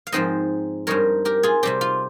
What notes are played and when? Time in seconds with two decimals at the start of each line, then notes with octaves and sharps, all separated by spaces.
0.07 F5
0.12 G#2 F3 C4 D#4 C5 D#5
0.87 G2 G3 C4 D#4 A#4 C#5
1.25 G4 A#4
1.43 F4 G#4
1.63 C3 G3 C4 G4
1.81 F4